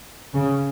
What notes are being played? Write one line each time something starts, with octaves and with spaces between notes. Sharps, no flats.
C#3